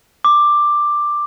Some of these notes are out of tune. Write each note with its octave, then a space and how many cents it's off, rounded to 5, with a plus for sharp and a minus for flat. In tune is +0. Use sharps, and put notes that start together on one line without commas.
D6 +10